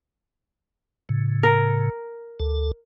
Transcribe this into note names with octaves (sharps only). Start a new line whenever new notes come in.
A2 C#3
A#4
D2 A4